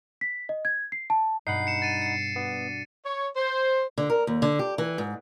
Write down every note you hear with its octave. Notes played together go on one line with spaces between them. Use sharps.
B6
D#5
G#6
C7
A5
G2 B2 D#4 F#5 B5 C7
C#7 E7
A6 D#7
C7 C#7
B3 D4 F#4
C#5
C5
D3
A#4
D#2
D3
G4
E3
G#2